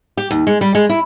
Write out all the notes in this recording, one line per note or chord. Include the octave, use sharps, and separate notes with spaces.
G4
D#2
G#3
G3
G#3
E4